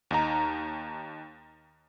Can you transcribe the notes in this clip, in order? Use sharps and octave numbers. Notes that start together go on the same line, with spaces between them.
D#2 D#4 A#5